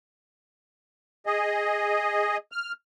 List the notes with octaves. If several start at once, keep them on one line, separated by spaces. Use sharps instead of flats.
G#4 D#5
F6